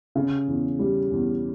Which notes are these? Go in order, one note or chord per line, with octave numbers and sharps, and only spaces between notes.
C#3
E2
G3
E2